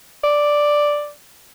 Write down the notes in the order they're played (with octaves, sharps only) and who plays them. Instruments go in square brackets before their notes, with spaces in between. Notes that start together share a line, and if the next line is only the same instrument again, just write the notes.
[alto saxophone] D5